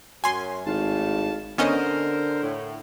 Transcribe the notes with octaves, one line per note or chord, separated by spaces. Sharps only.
F#2 G#5 C6
G#1 A2 F5 A5
D3 B3 C#4 A#4 C5 D#5
A2